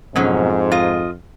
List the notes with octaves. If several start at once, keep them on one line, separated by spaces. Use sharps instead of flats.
F2 G#2 B2 F#3 C#4
F4 D#5